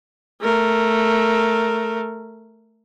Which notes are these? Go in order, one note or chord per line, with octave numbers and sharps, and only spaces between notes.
A3 A#4